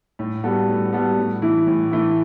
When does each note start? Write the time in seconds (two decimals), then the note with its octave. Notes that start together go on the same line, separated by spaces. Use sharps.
0.19 A2
0.43 G3 B3 F#4 A4
0.69 A2
0.93 G3 B3 F#4 A4
1.18 A2
1.42 E3 A3 E4
1.67 A2
1.91 E3 A3 E4